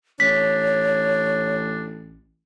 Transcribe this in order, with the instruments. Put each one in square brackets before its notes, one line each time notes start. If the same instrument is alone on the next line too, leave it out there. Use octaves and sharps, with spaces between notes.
[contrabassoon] A1 [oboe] D4 [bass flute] C#5 [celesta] B6